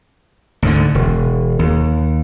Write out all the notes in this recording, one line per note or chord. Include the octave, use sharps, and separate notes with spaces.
D2 G#2 D3
E1
D#2